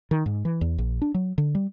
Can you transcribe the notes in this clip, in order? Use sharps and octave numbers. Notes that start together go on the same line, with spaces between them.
D#3
G#2
E3
E2
A#1
D4
F#3
D3
G3